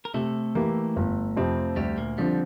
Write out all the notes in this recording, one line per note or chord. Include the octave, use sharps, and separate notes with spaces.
A#4
C3 A3 A4
E3 A#3 E4 G4
G1
F2 C3 F3 C4
D2 G3 G4
A#2 A#3
D3 F3 G3 C4